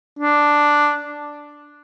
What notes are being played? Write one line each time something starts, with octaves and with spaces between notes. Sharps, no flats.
D4